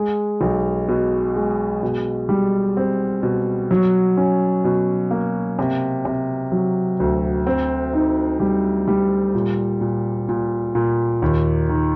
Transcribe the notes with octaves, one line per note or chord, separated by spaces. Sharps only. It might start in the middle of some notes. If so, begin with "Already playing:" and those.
Already playing: G#3
B1
B2
G#3
B2
G3
C4
B2
F#3
C#4
B2
A#3
C3
C3
F#3
D2
C4
D#4
G3
G3
A#2
A#2
A#2
A#2
D#2
D#3